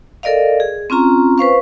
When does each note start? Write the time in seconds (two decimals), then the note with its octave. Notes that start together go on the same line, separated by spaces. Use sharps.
0.23 A4 A#4 D5 D#5 F5
0.60 G#4
0.90 C4 C#4 F4 A#5
1.38 B4 C5 F5 C#6